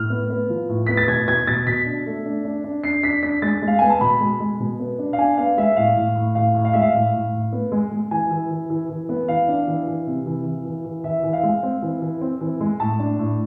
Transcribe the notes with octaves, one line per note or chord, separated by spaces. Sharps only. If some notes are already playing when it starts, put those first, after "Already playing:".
Already playing: A2 F6
B3
B3
F3
A2
B3 B6
A6
B2 G#6
B2 G#6
B2 A6
B2 B6
D4
A3
D4
D4
D4
D4 C7
D4 B6
D4 B6
G#3 A6
G#3
F5
B3 G#5
A5
B2 B5
G#3
G#3
B2
B3
D4
F5
D4 G#5
B3 F5
G#3 E5
A2 F5
A2
A2
A2 F5
A2
F5
G#3 E5
F5
A2
A2
A2
B3
G#3
G#3
E3 G#5
E3
E3
E3
E3
B3
E3 F5
D4
E3
E3
C3
E3
E3
E3
E3
E3 E5
E3
F5
G#3
C4
E3
E3
C4
E3
G#3
A2 A5
D4
A2